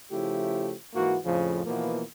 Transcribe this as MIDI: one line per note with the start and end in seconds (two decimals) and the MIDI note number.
0.11 0.73 49
0.11 0.73 53
0.11 0.73 57
0.11 0.73 64
0.11 0.73 67
0.94 1.18 44
0.94 1.18 52
0.94 1.18 58
0.94 1.18 66
1.24 1.64 41
1.24 1.64 45
1.24 1.64 49
1.24 1.64 53
1.65 2.03 47
1.65 2.03 52
1.65 2.03 53
1.65 2.03 58
1.65 2.03 59